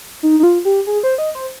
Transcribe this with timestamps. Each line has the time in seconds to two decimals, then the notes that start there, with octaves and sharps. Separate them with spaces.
0.23 D#4
0.40 D#4
0.43 F4
0.65 G4
0.87 G#4
1.03 C5
1.18 D#5
1.35 C5